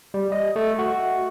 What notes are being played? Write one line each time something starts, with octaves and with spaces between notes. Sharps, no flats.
G3
D#5
A3
F#4